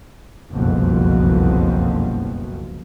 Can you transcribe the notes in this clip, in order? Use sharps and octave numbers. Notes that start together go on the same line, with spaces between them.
F#1 C2 F2 B2